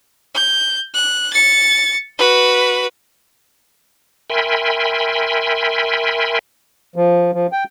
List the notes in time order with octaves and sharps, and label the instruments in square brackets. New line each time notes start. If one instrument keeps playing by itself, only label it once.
[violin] G6
F#6
A6 C#7
F#4 B4
[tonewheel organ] A#4 E5 G5 G#5 B5 C6
[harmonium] F3
F3
G5